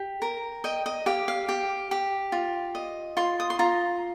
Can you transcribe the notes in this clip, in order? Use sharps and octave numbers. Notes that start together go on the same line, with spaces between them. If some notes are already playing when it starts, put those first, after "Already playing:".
Already playing: G4
A#4
D#5 G5
D#5
G4 F5
F5
G4
G4
F4
D#5
F4 C6
D#6
C6
F4 A#5